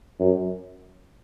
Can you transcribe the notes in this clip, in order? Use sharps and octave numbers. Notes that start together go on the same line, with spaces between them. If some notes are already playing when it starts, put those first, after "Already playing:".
F#2